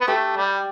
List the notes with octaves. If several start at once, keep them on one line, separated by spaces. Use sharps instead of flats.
B3
A3 G4
G3